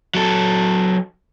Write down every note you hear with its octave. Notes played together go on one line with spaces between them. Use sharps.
F#3 A4